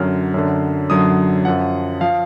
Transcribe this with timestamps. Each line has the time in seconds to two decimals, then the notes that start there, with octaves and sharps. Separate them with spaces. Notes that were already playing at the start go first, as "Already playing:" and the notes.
Already playing: F#2 D3 F#3 F6
0.34 F#2 D3 F#3
0.90 F#2 D3 F#3 D#6
1.45 F#2 F3 F#5
2.01 F3 F5